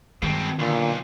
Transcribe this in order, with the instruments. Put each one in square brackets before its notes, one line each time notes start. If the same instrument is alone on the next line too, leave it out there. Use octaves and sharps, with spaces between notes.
[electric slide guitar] G2 G#3 [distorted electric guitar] B2 C4 [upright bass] D#3
[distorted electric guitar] B1 [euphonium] A#2 [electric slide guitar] D3